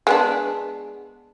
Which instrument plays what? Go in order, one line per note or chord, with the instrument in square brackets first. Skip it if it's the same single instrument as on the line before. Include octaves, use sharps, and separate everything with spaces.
[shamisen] G#3 B3 D4